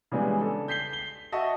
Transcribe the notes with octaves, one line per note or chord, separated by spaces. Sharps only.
C#3 E3 G3 G#3 B3 D4
A4
G6 B6 C7 G7
G7
F#4 D#5 E5 A5 C#6